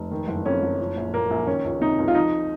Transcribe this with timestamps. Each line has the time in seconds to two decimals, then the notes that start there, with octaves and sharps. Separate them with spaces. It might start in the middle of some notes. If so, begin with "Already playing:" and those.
Already playing: F1
0.11 D#3
0.28 F#1
0.45 F2 C#4
0.62 F#1
0.79 F3
0.97 A#1
1.13 A#2 A#3
1.30 A#1
1.47 D#3 C#4
1.65 C#2
1.81 C3 D#4
1.98 C#2
2.08 F4
2.15 F3 D#4